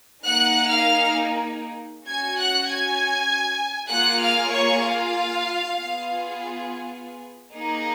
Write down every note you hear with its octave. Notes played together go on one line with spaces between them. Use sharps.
A#3 D#4 G#4 F#5 F#6
F5 F6
C#4 F#4 G#5 G#6
F#5 F#6
G#5 G#6
A#3 F4 G#4 F#5 F#6
F5 F6
C#5 C#6
F4 F5
B3 F4 G#4
A#3 D#4 G#4